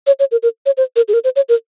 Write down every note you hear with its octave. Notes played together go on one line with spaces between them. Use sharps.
C#5
C#5
A#4
A#4
C#5
C5
A#4
G#4
A#4
C5
C#5
A#4